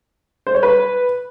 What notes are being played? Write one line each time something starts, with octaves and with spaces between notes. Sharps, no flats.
C5
C#5
B4